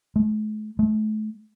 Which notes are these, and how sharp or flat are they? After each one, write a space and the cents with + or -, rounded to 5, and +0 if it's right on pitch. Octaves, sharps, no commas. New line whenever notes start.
A3 -45
A3 -35